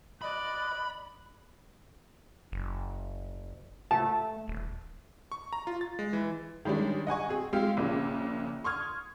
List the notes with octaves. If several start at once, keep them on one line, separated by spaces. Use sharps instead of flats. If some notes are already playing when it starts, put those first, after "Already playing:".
D5 D#5 B5 F#6
F#1
A3 A5
D#1
C#6
A#5
F4
A6
G#3
E3
D#3 G3 G#3 C#4 D4
D#5 F#5 G#5 C#6
C4 G#4
G#3 C4 F4 G4 F5
A#1 A#2 C#3
C6 C#6 D#6 F6 G#6